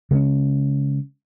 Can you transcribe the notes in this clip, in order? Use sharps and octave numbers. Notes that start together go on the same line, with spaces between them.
C#3 G#3 C4 C#4